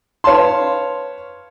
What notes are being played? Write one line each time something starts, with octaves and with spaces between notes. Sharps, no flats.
B4 C#5 F5 A5 C6